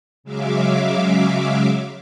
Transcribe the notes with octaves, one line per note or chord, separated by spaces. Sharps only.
C#3 F#3 G#3 E5 F5 D6